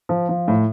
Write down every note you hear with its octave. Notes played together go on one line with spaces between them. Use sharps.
F3
F3
A2